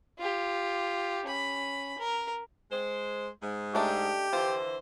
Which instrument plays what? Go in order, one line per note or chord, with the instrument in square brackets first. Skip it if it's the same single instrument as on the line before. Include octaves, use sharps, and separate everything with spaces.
[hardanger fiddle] F4 G4
C#4 B5
A#4
[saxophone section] G#3 C5
G#2 G#3
[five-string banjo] A3 D4 D#4 [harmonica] G4
[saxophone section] D3 E3 C5 [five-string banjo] F3 F4